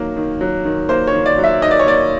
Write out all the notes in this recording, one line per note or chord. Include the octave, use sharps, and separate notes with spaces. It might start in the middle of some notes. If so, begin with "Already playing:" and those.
Already playing: D#3 F#3 A#3
D#3
F#3
D#3
A#3 C5
C#5
D#3
D5
F#3
E5
D#3 D#5
D5
C#5
A#3 D5